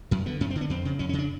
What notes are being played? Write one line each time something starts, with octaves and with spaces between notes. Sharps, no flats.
F#2 F#3
D3 B3
F#2 C#4
C4
D3
B3
F2 C4
C#3
F2 C#4
C#4
C#3
D4